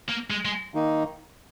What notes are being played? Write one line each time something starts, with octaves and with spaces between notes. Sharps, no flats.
A#3
G#3
G#3
D#3 A#3 D#4